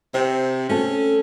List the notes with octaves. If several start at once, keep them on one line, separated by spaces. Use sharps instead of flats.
C3 C4
A3 C#4 A4